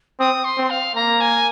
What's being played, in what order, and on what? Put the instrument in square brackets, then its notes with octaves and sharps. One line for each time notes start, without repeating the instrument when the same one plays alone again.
[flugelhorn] C4 [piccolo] D#6
[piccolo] C6
[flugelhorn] C4
[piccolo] F5
[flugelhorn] A#3 [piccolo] A#5
[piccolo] G#5